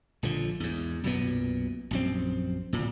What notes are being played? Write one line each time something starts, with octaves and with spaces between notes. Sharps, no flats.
A#1 D3 F3
E2 G#2
B1 F#2 A#2 B3
A#1 F#2 C4
D1 A#2